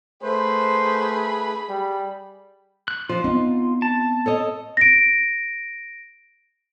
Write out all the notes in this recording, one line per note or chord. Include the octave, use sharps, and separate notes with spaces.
A3 G#4 B4 C5 B5
G3
F#6
F3 F4
B3 C4 D#4
A5
A4 C#5 D#5
A#6 D7